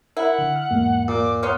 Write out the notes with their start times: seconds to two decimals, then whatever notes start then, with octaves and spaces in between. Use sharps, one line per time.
0.17 E4 A#4 F#5
0.39 D3
0.56 F6
0.71 E2 G#2 A#3
1.08 A#2 D6
1.43 B3 C#5 F5 C6